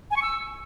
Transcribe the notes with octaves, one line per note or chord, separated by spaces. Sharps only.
G#5
C#6
E6